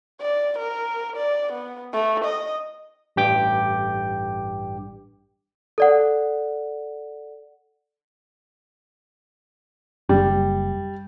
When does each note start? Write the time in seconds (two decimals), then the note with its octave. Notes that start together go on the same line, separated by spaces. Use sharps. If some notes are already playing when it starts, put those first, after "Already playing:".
0.20 D5
0.58 A#4
1.16 D5
1.53 B3
1.93 A3
2.24 D#5
3.16 A1 G2 G4 G5 D6 G6
5.78 A4 D5 F#5
10.09 F#1 G3